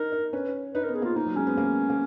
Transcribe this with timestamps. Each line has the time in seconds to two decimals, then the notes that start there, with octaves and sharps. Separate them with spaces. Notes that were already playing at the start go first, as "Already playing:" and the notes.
Already playing: D#4 A#4
0.12 D#4
0.33 C#4 B4
0.74 D#4 B4
0.84 B3 A#4
0.95 G#4
1.02 A#3 F4
1.16 A#3 D#4
1.26 F#3
1.36 G#3 C#4
1.47 B3
1.57 A#3
1.90 A#3